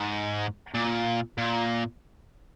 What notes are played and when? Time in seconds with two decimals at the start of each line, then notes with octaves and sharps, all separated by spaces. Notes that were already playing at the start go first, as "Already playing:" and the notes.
Already playing: G#2
0.75 A#2
1.38 A#2